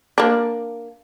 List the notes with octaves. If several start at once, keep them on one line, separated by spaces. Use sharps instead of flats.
A#3 D4